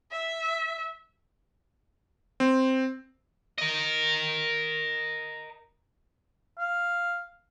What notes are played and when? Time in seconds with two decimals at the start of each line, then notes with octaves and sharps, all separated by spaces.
0.12 E5
2.40 C4
3.58 A#4 D#5
6.59 F5